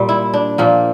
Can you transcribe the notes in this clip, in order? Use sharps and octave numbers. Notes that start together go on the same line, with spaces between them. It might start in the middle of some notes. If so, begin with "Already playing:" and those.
Already playing: A#2 G3
E4
D4
A#2 F3 A#3